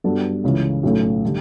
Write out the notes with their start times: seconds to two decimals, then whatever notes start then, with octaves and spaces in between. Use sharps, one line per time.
0.04 G2 F#3 B3 D4 A4
0.44 C#2 C#3 E3
0.83 B1 A2 F#3 A3 C#4
1.25 D3 G3